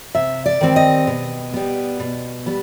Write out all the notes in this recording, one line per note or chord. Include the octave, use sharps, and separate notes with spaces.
C3 E5
D5
D#3 G3 C4
D#5
B2
G3 B3
B2
G3 B3